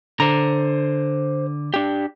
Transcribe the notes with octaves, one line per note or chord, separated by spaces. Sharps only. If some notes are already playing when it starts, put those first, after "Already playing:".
D3 C5 A#5
D4 G4